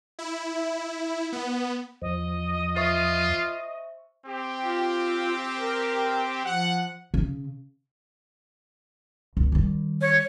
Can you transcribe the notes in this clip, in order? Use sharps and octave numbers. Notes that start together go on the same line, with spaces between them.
E4
B3
E2 F3 D#5
F4 C5 E5 C#6
C4 G4
F4
A#4
F3 F#5
C#3
C#2
D#3 G3
C#5